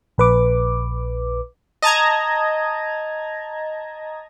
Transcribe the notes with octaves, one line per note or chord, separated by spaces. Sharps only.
A#1 B4 D6
D#5 A5 A#5 G#6